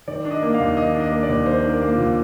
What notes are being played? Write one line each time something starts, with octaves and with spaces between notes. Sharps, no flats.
D#3 D5
D4
D#5
A#3
F5
D#2
D#3 D#5
D4
D#5
A#3
D5
D#2
D#3 C5
D4
A#4
A#3
F4
D#2